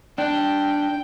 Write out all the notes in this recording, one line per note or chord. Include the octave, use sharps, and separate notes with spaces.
D4 G5